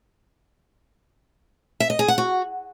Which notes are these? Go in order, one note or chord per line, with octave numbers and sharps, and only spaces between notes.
E5
D#5
G#4
F#5
F#4